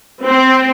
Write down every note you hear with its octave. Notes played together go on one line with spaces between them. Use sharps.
C4